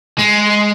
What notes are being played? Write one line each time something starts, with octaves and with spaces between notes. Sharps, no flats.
G#3